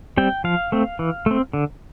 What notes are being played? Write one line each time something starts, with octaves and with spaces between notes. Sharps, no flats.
G3 C4 G5
F3 F5
A3 C4
E3
A3 C4
D3